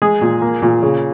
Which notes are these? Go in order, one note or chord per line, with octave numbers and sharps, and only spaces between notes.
G#3 G#4
A#2
A#3
A#2
C#3